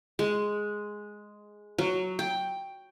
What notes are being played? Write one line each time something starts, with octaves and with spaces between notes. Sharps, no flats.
G#3
F#3
G5